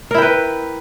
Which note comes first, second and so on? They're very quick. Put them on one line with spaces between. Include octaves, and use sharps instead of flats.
A#4 E4 G5 B4